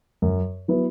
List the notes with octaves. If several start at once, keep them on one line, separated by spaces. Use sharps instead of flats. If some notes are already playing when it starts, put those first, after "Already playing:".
F#2
F#3 B3 E4 B4